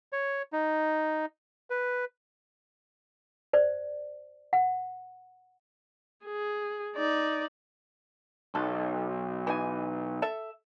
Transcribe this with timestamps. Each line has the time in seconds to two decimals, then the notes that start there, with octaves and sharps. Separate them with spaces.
0.12 C#5
0.53 D#4
1.70 B4
3.53 C5 D5
4.53 F#5
6.25 G#4
6.96 D#4 D5
8.55 B1 A4
9.47 E3 D#4 G#5
10.22 A4 E5